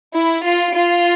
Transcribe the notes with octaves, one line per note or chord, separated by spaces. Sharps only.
E4
F4
F4